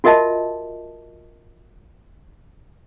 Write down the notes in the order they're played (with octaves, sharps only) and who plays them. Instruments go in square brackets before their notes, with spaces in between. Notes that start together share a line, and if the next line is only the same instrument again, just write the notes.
[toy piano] F4 F#4 A#4 D#5 E5 A5